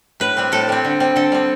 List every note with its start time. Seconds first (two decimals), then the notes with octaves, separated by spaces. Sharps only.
0.20 A2 B4
0.37 G3 C4
0.52 A2 A4
0.69 G3 C4
0.85 D3
1.00 G3 C4
1.16 D3 A4
1.32 G3 C4